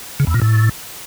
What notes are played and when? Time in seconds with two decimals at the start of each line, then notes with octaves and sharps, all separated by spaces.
0.20 C#3
0.27 E2
0.34 A#2
0.42 A2